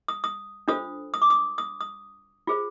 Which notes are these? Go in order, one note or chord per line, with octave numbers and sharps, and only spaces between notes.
D#6
D#6
D4 F4 A4 C5 D#6
D#6
D6
D#6
D#6
D#6
F4 G#4 C5